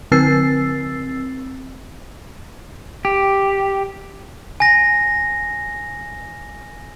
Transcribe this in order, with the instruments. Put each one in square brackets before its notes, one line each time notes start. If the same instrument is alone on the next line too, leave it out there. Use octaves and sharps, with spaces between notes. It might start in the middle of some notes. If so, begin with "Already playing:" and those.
[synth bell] D3 C4 E6 A6 C7
[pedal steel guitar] G4
[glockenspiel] G#5 A#6